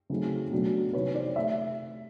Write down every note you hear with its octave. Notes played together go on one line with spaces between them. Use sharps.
C#3 F#3 A3 C4 D#4
B2 F#3 A3 D4
C3 D#3 F#3 B4 C#5
C5 D5
A3 E5